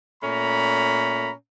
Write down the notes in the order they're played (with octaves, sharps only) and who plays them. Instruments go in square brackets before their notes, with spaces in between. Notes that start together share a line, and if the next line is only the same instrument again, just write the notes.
[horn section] A#2 A3 C#4 A#5 B5